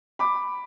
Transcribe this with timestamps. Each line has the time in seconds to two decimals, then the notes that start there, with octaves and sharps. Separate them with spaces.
0.19 B5 D6